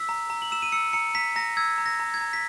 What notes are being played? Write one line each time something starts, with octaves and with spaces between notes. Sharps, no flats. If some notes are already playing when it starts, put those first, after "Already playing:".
Already playing: E6 B6
A#5
A#5
F#7
E6 E7
D#7
E6 C#7
A#5 C#7
A#5 B6
A#5 A#6
E6 G#6
A#5
A#6
A#5
G#6
A#5
B6